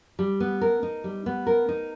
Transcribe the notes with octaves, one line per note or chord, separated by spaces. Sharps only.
G3
B3
A#4
D#4
G3
B3
A#4
D#4